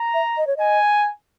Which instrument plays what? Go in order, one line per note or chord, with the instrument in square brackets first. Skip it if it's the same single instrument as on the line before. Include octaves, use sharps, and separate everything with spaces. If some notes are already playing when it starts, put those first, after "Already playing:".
Already playing: [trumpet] A#5
[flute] E5
D#5
C#5
[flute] D#5 [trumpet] G#5